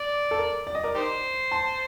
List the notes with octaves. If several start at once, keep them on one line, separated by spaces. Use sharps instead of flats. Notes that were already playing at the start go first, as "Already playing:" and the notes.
Already playing: D5
A4
A#4
D5
D#5
A#4 D5
D#4 G4 C5
A5 C6